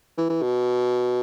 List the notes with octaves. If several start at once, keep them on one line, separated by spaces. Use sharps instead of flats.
E3
E3
B2